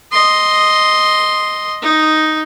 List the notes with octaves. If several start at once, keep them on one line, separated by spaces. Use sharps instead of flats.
D#5 C6
D#4